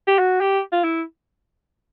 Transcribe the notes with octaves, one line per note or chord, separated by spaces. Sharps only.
G4
F#4
G4
F4
E4